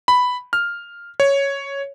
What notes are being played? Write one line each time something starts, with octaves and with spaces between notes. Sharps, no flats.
B5
F6
C#5